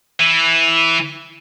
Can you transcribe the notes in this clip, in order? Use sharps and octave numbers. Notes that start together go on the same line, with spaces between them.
E3